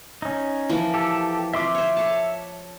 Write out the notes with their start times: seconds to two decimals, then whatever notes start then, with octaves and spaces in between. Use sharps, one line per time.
0.22 C#4 D#4
0.69 E3 F3 A#3
0.94 G4 A4
1.53 C4 F4 E5 C6 D6
1.75 C5 C#5
1.97 A4 C#5 A5